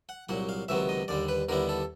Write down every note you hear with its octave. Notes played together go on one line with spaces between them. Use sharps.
F#5
C2 A#2 F#3 F#5
F5
C#2 C3 D#3 F#3 B3 E5
D#5
D#2 D3 G3 D5
B4
D#2 D3 G3 B3 E4 A#4
A4